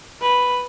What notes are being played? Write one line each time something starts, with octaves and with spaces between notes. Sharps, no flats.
B4